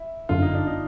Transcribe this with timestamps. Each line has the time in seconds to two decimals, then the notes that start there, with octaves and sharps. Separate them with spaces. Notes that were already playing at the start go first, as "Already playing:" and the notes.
Already playing: E4
0.29 G1 F#2 D3 F4
0.42 D#4
0.54 D4
0.67 D#4